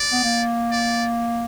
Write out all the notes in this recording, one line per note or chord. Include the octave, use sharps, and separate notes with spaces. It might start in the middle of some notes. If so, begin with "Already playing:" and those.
Already playing: D5
B3
A#3
D5